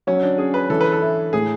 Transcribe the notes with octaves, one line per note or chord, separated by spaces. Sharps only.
F#3 C#4
D4
C#4 G#4
B4
E3 A4
B4
A4
E4
A2 G#4